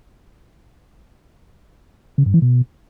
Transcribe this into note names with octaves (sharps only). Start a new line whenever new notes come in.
C#3
G2
E3
B2